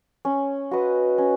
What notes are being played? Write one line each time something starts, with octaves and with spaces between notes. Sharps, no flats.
C#4
F#4 B4 D#5
C#4